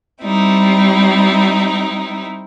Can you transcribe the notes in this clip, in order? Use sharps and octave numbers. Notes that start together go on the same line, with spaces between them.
G3 C4 D#4 E4